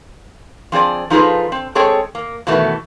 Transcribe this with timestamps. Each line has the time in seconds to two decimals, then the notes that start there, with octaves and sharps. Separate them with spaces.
0.72 F3 C4 G#4 D5
1.10 F3 D#4 F4 G#4 A4 B4
1.52 C4
1.75 G#3 C4 G#4 A4 C#5 G5
2.15 A#3
2.47 B2 D#3 E3 A3 B3